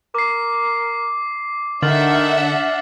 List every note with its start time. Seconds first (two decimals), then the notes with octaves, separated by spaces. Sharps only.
0.15 A#4 D6 C7
1.83 D3 D#3 D4 E5 F#5 F6 A6 F#7